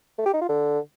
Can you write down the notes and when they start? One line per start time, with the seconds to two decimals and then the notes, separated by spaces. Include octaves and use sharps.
0.18 A3
0.26 G4
0.34 D#4
0.41 F4
0.49 D3